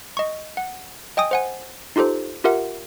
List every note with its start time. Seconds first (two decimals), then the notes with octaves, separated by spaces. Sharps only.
0.17 D#5 C#6
0.57 F#5
1.17 D#5 G5 G#5 D#6
1.31 C5 F#5 G#5
1.96 D#4 F4 G4 A4 C5
2.44 F4 G4 A#4 E5 F#5